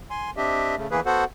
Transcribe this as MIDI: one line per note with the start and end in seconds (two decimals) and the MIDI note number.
0.10 0.30 80
0.10 0.30 84
0.37 0.75 60
0.37 0.75 62
0.37 0.75 67
0.37 0.75 75
0.37 0.75 76
0.77 0.87 49
0.77 0.87 57
0.91 1.00 40
0.91 1.00 52
0.91 1.00 58
0.91 1.00 68
0.91 1.00 71
1.06 1.24 59
1.06 1.24 66
1.06 1.24 69
1.06 1.24 72
1.06 1.24 78